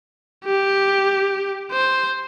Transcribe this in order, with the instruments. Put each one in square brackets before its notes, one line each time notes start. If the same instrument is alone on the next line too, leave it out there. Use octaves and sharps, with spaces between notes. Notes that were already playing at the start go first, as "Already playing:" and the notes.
[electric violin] G4
C5